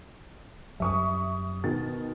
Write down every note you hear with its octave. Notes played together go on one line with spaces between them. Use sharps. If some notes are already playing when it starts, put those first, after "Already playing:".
F#2 G3 E5 C#6 D#6
B2 D#3 A6